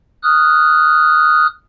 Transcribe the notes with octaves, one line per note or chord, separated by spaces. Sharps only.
D#6 F6 F#6